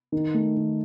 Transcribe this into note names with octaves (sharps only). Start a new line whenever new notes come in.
D#3
A3
D#3